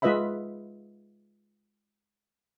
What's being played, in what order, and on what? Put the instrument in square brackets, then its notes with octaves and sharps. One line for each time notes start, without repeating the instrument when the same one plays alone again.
[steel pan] G#3 F4 B4 D#5 E5 B5